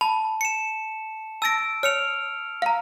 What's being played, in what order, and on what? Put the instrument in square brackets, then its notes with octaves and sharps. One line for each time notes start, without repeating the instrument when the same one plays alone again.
[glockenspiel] A5 [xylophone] B5
[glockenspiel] C#7 E7
[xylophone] A5 A6 A#6 [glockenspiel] E6 D7
[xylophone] C#5 [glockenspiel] F6 C#7 F7
[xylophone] F5 A#5